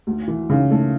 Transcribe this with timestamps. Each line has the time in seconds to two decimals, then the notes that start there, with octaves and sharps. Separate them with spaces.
0.07 D2
0.28 E3
0.50 C#3
0.71 A3